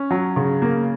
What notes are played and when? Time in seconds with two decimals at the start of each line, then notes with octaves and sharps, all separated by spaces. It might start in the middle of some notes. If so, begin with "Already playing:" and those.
Already playing: C#4
0.11 F#3
0.36 C#3
0.62 A#3